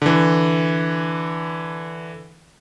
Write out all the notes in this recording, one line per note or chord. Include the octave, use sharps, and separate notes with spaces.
D3 E3